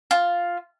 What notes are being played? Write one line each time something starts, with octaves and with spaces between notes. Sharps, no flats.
F4